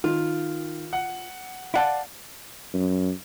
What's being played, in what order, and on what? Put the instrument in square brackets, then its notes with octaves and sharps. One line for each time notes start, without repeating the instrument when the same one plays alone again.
[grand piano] D#3 [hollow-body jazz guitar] F4
[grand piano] F#5
[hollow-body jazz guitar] E4 F#5 A5 [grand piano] D5 F5
[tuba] F#2